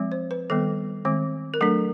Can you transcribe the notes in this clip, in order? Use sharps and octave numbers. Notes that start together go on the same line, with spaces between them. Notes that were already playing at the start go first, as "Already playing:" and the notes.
Already playing: F3 G#3 C4
C5
B4
D#3 G3 B3 A4
D#3 G#3 C4
A#4
F#3 A3 D4 A4